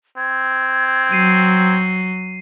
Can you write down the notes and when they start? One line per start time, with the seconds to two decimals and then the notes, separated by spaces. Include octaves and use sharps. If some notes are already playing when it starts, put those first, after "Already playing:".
0.18 C4 G#6
1.12 F#3 C7 D#7